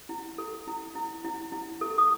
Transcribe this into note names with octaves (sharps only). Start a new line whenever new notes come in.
E4
A4
E4
E4
E4
E4
A4
D#6